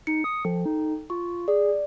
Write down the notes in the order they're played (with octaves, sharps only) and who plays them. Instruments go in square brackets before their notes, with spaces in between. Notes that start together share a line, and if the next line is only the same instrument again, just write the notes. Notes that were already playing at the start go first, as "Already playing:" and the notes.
[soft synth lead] D#4 [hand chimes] C#7
[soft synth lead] D#6
[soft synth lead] F3 [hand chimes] A4 G5
[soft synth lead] D#4
[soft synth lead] F4 [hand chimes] C#6
[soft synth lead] G#4 [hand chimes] D5